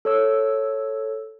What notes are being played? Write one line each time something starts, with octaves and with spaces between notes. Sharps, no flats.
A4 C#5 E6